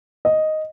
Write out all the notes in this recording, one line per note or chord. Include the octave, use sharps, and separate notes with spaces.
D#5